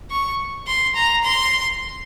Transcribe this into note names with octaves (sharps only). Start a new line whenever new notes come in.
C#6
C6
A#5
C6